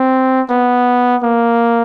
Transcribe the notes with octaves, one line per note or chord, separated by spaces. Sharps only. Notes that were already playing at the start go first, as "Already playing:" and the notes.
Already playing: C4
B3
A#3